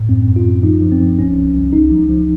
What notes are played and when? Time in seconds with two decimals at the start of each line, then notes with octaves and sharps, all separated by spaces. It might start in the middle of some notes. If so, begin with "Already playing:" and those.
Already playing: A2
0.09 F#2 C4
0.28 F#2
0.36 F4
0.45 F#2
0.63 F3 D#4
0.82 F3
0.92 C4
1.01 F3
1.19 C2 C#4
1.36 C2
1.56 C2
1.73 C#2 D#4
1.91 F3
2.09 F3